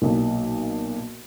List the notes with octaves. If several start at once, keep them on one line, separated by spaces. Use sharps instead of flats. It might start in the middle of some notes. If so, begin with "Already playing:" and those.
B1 A#2